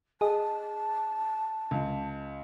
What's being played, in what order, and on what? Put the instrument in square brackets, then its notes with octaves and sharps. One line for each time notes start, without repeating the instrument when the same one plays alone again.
[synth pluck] G#4 D#5 [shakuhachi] A5
[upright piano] C#2